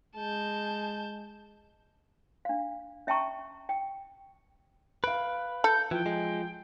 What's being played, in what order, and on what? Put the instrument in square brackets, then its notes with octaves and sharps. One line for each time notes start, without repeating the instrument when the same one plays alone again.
[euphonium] G#3 [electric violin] A5 G6
[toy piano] D4 F5
C#4 E5 G5 A5 A#5 C#6
G5
[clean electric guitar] B4 [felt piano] F5 D7
[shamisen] A4 [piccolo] G6
[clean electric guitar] E3 [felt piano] F3 [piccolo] G5
[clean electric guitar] G#3